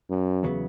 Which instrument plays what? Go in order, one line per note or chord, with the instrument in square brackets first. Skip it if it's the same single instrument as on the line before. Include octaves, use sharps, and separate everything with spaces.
[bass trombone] F#2
[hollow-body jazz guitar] E2 C#3 F#3 B3